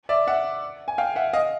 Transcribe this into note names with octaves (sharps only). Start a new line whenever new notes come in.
D5 E5
E5 F#5
G#5
F5 G5
E5 F#5
D#5 F5